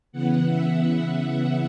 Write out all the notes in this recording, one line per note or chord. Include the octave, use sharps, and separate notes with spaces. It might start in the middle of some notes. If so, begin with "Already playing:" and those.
C#3 E3 B3 F#5
E5
F#5